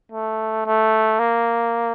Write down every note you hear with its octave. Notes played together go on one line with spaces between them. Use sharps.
A3
A3
A#3